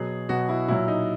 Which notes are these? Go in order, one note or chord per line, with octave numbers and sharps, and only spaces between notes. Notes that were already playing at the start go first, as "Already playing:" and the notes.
Already playing: B2 F#3 G#4
B2 F#3 F#4
E4
A#2 F#3 E4
D#4